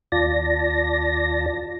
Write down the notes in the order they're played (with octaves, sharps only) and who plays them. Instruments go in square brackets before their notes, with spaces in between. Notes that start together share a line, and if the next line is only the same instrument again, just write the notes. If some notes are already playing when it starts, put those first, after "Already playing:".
[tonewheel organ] D#2 F4 D5 A5 A#6